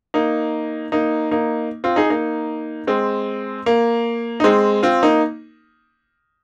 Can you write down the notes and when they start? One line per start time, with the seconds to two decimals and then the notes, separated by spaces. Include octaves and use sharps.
0.14 A#3 D#4
0.92 A#3 D#4
1.31 A#3 D#4
1.84 C4 F4
1.96 D#4 G#4
2.10 A#3 D#4
2.87 G#3 C4
3.66 A#3
4.40 D#4
4.44 G#3 C4
4.83 C4 F4
5.03 A#3 D#4